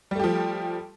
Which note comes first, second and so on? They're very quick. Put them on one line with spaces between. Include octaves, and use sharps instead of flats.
G3 A3 G4 F3